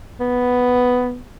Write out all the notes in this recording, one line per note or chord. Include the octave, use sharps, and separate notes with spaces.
B3